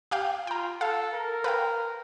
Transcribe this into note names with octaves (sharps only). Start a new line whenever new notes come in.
G4 F5 G5
F4 G5 A#5
A4 F5
A#4
B4 F5 G5